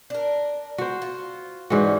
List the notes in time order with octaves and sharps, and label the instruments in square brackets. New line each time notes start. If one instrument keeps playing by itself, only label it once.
[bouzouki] D4 A#4
[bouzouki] B3 [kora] F#4 C5
[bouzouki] F4
[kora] G#2 E3 F#4 [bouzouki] G3 C#4